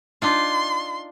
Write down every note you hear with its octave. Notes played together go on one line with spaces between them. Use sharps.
D4 D#4 F4 C6